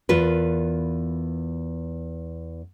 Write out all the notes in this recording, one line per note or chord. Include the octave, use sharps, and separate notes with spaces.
E2 F4 A#4 B4